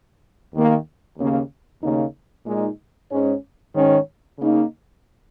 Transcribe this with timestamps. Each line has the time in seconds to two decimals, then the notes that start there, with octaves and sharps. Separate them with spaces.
0.53 D#2 D#3 A#3
1.17 D#2 C#3 A#3 C#4
1.82 D#2 C#3 A#3 D#4
2.46 A#2 G#3 D#4
3.10 G#2 G#3 C#4
3.75 G#2 D#3 C#4
4.39 C#3 A#3 D#4